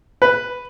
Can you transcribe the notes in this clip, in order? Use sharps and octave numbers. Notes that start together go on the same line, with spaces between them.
B4